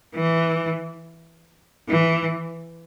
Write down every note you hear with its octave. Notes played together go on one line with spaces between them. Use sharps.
E3
E3